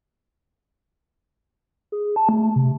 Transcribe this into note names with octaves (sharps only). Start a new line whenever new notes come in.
G#4
A5
A3
C3